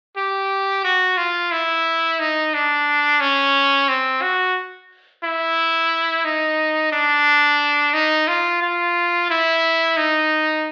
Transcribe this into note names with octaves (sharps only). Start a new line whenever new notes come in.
G4
F#4
F4
E4
D#4
D4
C#4
C4
F#4
E4
D#4
D4
D#4
F4
F4
E4
D#4